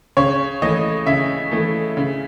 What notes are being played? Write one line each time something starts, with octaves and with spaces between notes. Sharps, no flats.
C#3 C#5
E3 A3 D#5
C#3 E5
E3 A3
C#3